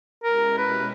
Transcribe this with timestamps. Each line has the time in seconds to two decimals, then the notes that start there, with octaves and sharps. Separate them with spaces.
0.24 B2 G#3 C#4 E4 G4 A#4
0.58 B4